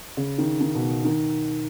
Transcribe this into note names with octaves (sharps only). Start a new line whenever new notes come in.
C#3
D#3
D#3
B2
D#3